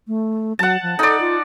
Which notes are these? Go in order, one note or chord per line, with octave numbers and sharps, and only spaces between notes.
A3
F#3 F#5 A5
F3
D#4 A4 D5
F4